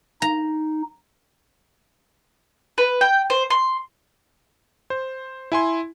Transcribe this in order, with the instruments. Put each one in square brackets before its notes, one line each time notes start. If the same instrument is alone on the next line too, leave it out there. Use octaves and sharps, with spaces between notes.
[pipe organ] D#4 [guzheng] A#5
[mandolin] B4
G5
C5
C6
[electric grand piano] C5
E4 G#5 C6